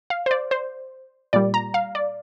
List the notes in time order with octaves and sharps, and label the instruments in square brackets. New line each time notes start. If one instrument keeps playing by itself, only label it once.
[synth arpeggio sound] F5
C5
D5
C5
A#2 G3 D5
A#5
F5
D5